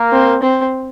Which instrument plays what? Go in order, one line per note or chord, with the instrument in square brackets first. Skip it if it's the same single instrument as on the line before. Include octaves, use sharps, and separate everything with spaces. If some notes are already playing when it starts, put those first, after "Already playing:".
Already playing: [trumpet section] A#3 A#4
[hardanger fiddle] C4
C4